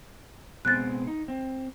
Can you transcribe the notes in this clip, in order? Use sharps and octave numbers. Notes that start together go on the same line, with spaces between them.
B2 G#3 C4 F#6 A6
D#4
C4